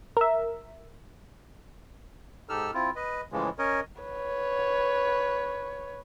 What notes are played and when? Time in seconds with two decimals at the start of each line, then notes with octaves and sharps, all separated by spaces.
0.17 A#4 E5
2.49 G#2 D#4 G4 A4 E6 F6
2.74 C4 E4 F4
2.96 B4 D#5
3.32 A2 C#3 E3 F3 G#3
3.59 C#4 A#4 C#5 D#5
4.02 B4 C#5